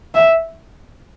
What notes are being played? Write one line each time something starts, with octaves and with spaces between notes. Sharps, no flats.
E5